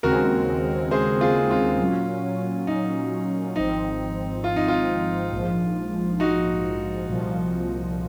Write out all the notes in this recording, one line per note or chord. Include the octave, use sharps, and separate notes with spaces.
D#2 C#3 G#3 C4 F#4 A#4
G#4 C5
F4 G#4
F4
A#2 F#3 C#4
D#4
G#1 G#2 F3 C4 D#4
F4
D#4
F4
A#1 G#2 F3
D#4 F#4
C2 A#2 F3